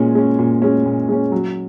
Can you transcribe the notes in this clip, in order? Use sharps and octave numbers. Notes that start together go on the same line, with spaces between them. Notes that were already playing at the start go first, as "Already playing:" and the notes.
Already playing: A#2 G#3 C#4
G#3 C#4
A#2
G#3 C#4
A#2
G#3 C#4
F#3